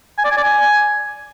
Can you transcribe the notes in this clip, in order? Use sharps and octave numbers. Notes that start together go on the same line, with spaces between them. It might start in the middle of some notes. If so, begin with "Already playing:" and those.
G#5
D5
G#5
D5
G#5